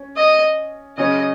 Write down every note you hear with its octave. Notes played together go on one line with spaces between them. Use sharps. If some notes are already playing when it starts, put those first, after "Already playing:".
Already playing: C#4
D#5
C#3 F#3 C#4 D#5